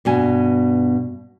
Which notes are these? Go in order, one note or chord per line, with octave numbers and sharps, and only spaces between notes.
G2 B2 G#5